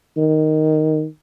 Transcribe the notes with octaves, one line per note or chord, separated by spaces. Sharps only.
D#3